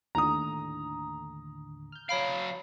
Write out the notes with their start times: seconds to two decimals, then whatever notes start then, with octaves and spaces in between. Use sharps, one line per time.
0.15 D#2 A2 D3 A#5 D#6
1.92 F6 G6
2.09 F#3 C#5 F5 B5 D7